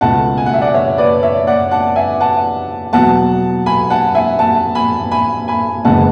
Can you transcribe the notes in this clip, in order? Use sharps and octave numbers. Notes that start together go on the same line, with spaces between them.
C#2 B2 A3 F#5 A5
G#5
F#5
E5
D5 F#5
C#5 E5
B4 D5
C#5 E5
D5 F#5
F#5 A5
E5 G#5
F#5 A5
E2 B2 F#3 F#5 A5
G#5 B5
F#5 A5
E5 G#5
F#5 A5
G#5 B5
G#5 B5
G#5 B5
F#1 E2 C#3 E3 G#3 F#5 A5